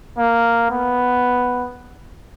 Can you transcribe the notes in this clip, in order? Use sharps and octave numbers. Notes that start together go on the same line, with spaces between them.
A#3
B3